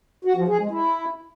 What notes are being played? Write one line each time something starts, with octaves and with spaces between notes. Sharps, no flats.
F#4
F3
G#4
G#3
E4